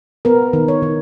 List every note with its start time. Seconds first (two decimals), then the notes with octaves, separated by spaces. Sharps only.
0.25 B3 A#4
0.53 D#3
0.68 C#5
0.82 D#3